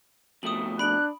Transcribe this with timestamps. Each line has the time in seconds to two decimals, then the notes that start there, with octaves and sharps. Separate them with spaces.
0.43 F2 B2 A3 D#6 F#7
0.79 D4 B5 F#6 D7 F#7